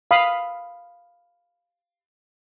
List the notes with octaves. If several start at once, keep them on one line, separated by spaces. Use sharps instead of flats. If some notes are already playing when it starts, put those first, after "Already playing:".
F5 B5 D#6